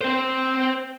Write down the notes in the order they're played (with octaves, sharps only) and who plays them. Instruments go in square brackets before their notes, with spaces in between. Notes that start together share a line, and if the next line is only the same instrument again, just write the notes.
[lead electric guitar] C4 C5